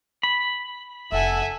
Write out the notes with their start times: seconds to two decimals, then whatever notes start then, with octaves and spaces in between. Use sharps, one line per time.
0.23 B5
1.12 F1 A4 E5 F#5 G#5